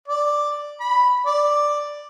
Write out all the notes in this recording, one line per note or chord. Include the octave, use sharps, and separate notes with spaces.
D5
B5
D5